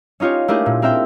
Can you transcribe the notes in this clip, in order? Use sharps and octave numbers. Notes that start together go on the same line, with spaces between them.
C#4 D#4 F4 G4 C#5
A3 A#3 D4 E4 G4 G#4
A#2
C4 A#4 E5 G5